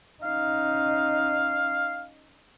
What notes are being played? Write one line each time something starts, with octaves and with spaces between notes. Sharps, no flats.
C#4 D#4 F5